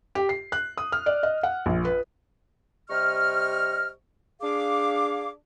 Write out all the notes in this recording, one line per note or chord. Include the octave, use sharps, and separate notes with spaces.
G4
C7
F#6
D#6
F6
D5
D#5
F#5
A#1
B4
C3 G3 D#5 C#6 F6
D4 G#4 F5 D6